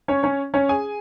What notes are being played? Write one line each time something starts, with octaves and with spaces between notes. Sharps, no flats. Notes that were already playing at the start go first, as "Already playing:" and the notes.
C#4 C#5
C#4 C#5
C#4 C#5
G#4 G#5